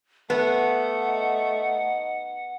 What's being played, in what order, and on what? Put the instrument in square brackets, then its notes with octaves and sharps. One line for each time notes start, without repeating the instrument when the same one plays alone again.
[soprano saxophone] A3 [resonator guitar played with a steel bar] B3 [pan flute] F#5
[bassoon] D#4